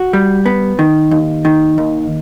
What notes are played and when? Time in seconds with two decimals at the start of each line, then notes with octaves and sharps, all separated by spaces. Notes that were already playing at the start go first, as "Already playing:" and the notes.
Already playing: F#4
0.13 G3
0.46 B3
0.79 D#3
1.11 D#2
1.45 D#3
1.78 D#2